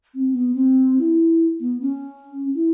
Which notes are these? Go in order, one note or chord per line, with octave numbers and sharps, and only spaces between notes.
C4
B3
C4
E4
B3
C#4
E4